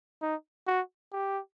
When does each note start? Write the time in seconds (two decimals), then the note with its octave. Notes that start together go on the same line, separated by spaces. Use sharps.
0.22 D#4
0.67 F#4
1.13 G4